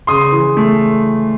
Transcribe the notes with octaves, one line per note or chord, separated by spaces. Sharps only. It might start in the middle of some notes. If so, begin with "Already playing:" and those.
C#3 C6 D#6
E3
A3